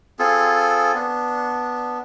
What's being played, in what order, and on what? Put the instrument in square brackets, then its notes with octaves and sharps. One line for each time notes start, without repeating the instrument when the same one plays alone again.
[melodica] C4 F4 G#4 A4
B3 D4